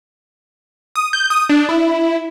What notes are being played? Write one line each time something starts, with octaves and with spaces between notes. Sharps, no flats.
D#6
G6
D#6
D4
E4